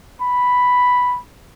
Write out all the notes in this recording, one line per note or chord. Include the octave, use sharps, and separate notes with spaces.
B5